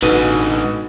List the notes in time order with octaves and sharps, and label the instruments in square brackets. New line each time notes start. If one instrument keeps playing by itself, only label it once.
[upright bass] A1 [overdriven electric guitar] G#2 D3 [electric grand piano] B2 B3 D#7 [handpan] D#4